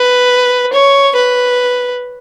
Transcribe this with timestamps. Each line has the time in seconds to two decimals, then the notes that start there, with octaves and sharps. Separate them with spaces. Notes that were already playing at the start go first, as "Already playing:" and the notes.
Already playing: B4
0.73 C#5
1.15 B4